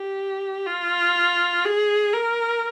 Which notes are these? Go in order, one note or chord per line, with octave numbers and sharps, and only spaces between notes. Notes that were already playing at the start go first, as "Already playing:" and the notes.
Already playing: G4
F4
G#4
A#4